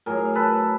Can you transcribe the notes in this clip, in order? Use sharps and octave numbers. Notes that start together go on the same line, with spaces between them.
A2 F#3 G#4 A#4
A4 B4